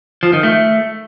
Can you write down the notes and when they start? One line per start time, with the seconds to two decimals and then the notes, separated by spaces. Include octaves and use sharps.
0.23 F3
0.33 D#3
0.43 A3